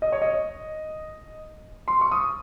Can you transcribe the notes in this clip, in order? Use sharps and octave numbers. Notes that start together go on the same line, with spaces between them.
D#5
C#5
D#5
C6
C#6
D#6